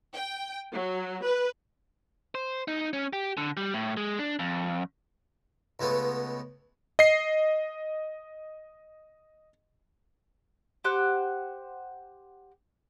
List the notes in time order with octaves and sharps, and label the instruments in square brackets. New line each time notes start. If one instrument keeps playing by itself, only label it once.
[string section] G5
F#3
B4
[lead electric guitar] C5
D#4
C#4
G4
D3
G3
A2
G#3
D4
F2
[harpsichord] C#2 G#3 A3 B3
[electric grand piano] D#5 C7
[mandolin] G4 C5 F#5